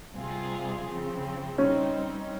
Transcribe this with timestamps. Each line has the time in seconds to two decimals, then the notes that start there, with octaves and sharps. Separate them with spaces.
0.15 C3 G3 C4 F4 G#4
0.87 C#3 F3 C4
1.58 G3 C4 C#4 D#4